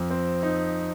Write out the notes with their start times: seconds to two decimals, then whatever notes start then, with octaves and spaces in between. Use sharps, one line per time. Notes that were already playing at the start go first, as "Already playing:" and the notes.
Already playing: F2
0.10 C4
0.43 D#4